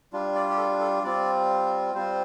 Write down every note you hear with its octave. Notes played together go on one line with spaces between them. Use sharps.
G3 D4 F4
D5
G4
A4
A4
G3 C4 F4 D5
G3 C4 F4 C5